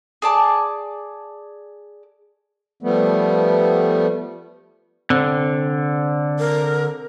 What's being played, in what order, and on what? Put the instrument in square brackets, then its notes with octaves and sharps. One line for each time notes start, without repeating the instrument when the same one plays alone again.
[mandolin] G#4 D5 A5 D6
[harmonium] F3 G3 A3 B3
[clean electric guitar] D3 [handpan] C4
[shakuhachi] A#4